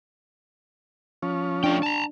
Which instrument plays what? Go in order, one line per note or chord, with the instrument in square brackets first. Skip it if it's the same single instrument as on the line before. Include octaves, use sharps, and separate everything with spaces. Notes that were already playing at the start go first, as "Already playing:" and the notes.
[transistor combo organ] F3 C#4
[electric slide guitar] A3 F4 G5 [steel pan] D4
[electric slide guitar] A5 A#5